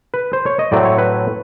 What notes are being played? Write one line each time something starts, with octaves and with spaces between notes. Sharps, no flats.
B4
C5
C#5
D#5
A2 F#3 A3 C4 D5
C#5
B4